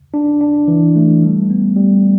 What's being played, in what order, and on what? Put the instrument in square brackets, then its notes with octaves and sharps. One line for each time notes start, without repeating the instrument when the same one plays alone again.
[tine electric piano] D4
D4
E3
A3
G3
B3
G3